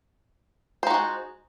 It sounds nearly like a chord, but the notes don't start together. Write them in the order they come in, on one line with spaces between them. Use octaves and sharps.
C5 D#4 F#4 G#3